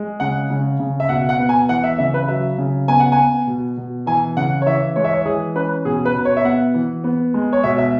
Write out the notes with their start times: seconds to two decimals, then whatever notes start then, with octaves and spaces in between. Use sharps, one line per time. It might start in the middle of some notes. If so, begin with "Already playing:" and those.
Already playing: G#3
0.20 C#3 F#5
0.50 C#3
0.79 C#3
1.00 E5
1.09 B2 F#5
1.29 F#5
1.40 B3
1.49 G#5
1.69 E3 F#5
1.84 E5
1.98 C#3 E5
2.14 B4
2.28 F#3 E5
2.58 C#3
2.88 B3 G#5
3.00 F#5
3.12 G#5
3.18 B3
3.47 B2
3.77 B2
4.06 E3 G#5
4.37 C#3 F#5
4.62 C#5
4.66 E3 E5
4.96 G#3 C#5
5.04 E5
5.13 C#5
5.25 E3 G#4
5.55 C#4 B4
5.85 B2 G#4
6.05 B4
6.15 B2
6.25 C#5
6.37 E5
6.44 B3 F#5
6.74 E3
7.04 B3
7.34 G#3
7.53 C#5
7.64 B2 E5
7.78 E5